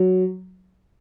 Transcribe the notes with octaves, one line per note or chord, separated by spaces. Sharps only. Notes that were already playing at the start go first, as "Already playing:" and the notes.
Already playing: F#3